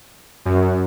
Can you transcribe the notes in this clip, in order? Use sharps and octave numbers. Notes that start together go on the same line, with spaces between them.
F#2